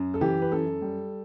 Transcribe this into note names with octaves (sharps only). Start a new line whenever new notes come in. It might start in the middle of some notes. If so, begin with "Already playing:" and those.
Already playing: F#2
A4
E3 G4
B4
F#2 A4
G3